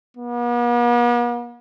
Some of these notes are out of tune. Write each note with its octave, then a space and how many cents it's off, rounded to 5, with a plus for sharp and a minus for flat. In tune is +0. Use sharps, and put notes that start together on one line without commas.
B3 -45